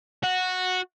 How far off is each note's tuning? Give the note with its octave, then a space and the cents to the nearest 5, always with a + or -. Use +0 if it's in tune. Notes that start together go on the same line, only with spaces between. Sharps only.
F#4 -10